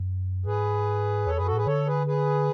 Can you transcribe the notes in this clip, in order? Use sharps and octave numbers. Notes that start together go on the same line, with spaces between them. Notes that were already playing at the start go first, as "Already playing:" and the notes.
Already playing: F#2
G#2 G#4 B4
E2 A4 C#5
F#2 G#4 B4
F#4 A4
A2 G#4 B4
D3 A4 C#5
G#4 B4
G#4 B4